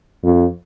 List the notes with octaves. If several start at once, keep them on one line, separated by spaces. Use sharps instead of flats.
F2